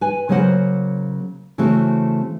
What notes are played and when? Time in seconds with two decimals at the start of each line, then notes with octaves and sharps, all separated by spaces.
0.01 B4 G#5
0.29 C#3 F#3 A#3 C5 F#5
1.58 C#3 E3 A3 C4 F#4